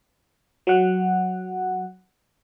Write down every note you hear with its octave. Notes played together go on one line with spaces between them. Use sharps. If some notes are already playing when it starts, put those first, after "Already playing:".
F#3 F#5